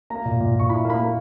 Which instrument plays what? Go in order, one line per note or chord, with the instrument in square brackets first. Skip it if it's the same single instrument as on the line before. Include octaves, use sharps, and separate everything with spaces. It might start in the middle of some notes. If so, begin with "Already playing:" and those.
[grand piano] A#3 A#5
A#2
A#2
A#2 C#6
E4 B5
A#3 B5
A#3